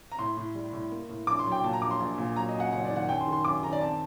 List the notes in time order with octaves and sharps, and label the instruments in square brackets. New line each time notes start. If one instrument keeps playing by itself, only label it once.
[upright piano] A#5
A2 C6
A2
G3
A2
A#3
A2
A#1 D6
C6
F#3
G5
A#2 A5
A#5
A#1 D6
C6
A#1
A#2
F#3 A#5
D#5
F#2
F#5
F#1 F#5
D5
D#3
F#5
F#2 G5
C6
D#3
C6
F#2 D6
D#3 A#5
D5
C4 A5